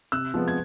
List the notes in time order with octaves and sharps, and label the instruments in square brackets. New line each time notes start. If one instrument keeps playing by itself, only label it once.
[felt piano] C3 E6 F#6
F3 G#3 B3
G#6